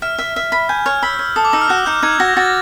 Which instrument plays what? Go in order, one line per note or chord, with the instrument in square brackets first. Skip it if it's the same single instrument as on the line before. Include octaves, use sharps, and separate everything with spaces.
[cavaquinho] E5 [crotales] F6
[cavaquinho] E5
E5
B5
[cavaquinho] G#5 [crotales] G6
[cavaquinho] C#5 [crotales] F6
[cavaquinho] B5 [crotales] E6
[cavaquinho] C#5
[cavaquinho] A4 [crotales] D#6
[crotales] D6
[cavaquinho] D#4 [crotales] E6
[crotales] F6
[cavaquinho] F#4 [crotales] F#6
[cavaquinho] D#4 [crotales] G6
[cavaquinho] D#4 [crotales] G#6
[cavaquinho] F#4 [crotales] A#6
[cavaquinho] F#4 [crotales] A6